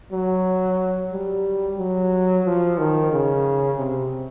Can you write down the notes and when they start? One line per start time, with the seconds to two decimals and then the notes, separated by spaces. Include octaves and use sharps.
0.12 F#3
1.12 G3
1.79 F#3
2.45 F3
2.78 D#3
3.12 C#3
3.79 C3